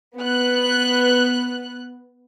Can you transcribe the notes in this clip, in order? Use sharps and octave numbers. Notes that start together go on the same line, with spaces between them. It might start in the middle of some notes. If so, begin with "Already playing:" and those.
B3 F#6